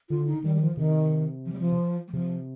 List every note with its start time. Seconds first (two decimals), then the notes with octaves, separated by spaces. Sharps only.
0.10 D3 F4
0.27 D#4
0.44 D#3 G3
0.55 G3
0.60 F3
0.77 C3 D#3
1.46 F3
1.52 G3
1.59 F3
2.08 G3
2.12 C3 F3